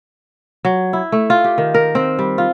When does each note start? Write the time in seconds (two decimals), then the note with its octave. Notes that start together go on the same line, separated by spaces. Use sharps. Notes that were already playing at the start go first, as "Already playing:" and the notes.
0.65 F#3
0.93 E4
1.12 A3
1.30 F4
1.44 G4
1.58 D#3
1.74 A#4
1.95 C4
2.19 G3
2.38 F4